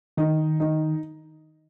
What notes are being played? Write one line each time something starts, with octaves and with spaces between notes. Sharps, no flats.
D#3 D#4
D#4